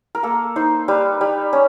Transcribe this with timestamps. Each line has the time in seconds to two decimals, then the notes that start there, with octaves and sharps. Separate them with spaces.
0.15 A#4
0.23 A#3 A4
0.56 D#4 C5
0.88 G3 B4
1.21 G3
1.53 C#4